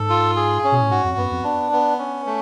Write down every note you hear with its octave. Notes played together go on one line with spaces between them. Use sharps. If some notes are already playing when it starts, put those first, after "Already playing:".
Already playing: G#2 A4
F4
G#4
C#4
B2
A2
G#2 F#4
F2
F#2 B3
F2
D4
B3
C#4
A3